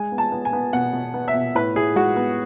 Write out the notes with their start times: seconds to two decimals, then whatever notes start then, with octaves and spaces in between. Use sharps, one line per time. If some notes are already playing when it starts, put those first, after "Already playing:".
Already playing: G#3 G#5
0.12 B3
0.18 A5
0.32 B3
0.45 G#5
0.53 B3
0.73 B2 F#5
0.93 B2
1.14 B3
1.28 E5
1.34 B2
1.55 A2 B4
1.75 A2 G#4
1.96 G#3 F#4
2.16 B3